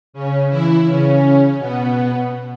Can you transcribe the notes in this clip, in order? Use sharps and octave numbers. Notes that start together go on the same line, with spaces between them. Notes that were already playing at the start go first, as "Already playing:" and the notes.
C#3 C#4
E3 E4
C#3 C#4
B2 B3